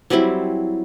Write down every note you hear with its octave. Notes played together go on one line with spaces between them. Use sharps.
F#3 G3 C4 E4